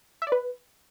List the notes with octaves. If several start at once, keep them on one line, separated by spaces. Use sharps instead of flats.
E5
D5
B4